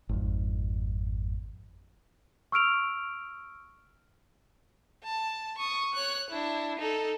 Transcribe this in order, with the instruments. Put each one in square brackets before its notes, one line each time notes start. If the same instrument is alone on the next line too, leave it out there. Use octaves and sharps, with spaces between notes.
[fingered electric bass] G#1 F2
[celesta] C#6 E6 F6 D7 F7
[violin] A5
C#6 D#6
C#5 F#6
D4 E4
D#4 A4